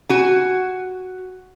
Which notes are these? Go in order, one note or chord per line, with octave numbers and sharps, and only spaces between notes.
F#4 G#5